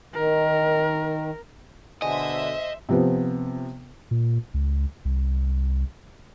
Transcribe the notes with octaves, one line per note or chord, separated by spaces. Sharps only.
D#3 A#4
B2 D3 G#3 C5 D#5 E5
C3 F3 B3
A#2
C#2
C2